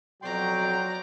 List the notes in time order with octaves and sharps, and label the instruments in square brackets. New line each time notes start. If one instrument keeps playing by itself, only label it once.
[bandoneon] F2 B2 C6 [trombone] F#3 [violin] D5 A#5 [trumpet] G5